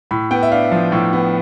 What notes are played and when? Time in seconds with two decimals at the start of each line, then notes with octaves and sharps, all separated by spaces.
0.11 A2 B5
0.31 B3 G5
0.43 E5
0.51 D4 F5
0.72 F3
0.92 A2
1.13 B3